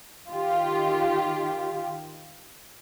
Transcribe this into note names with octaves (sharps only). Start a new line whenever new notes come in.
D#3 F4 G4